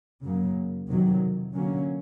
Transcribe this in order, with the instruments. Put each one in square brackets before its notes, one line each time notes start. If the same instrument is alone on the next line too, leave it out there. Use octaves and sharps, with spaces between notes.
[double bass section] F#2 C#3 F#3 A#3
F2 C3 D#3 F#3
D3 F#3 A#3 C#4